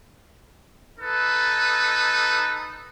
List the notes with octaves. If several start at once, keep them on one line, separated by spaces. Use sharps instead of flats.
D#4 A4 B4